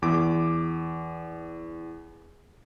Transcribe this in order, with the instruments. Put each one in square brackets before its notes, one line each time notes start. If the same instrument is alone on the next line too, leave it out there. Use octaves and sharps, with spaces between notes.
[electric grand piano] E2 D6